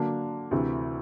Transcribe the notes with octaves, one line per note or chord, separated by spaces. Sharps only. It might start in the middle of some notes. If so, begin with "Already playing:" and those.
Already playing: D3 F#3 A#3 D4
D2 C3 E3